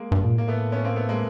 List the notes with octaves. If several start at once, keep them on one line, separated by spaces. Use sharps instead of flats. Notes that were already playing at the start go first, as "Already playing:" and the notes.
Already playing: G#3 A#3
G2
A#2
A2 A#3
A3 B3
B3 C#4
A#3 C4
A3 B3
G#3 A#3